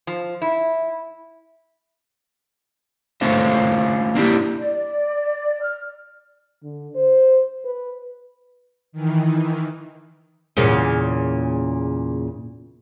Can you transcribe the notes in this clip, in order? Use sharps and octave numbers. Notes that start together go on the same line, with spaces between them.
F3
E4
A3 C#4 F4 C5 E5
A#3 D4 E4 G4
D5
F6
D3
C5
B4
D#3 E3
E2 A#2 C#3